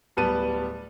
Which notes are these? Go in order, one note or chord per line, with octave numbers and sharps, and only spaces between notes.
D1 G3 B3 A5 D#7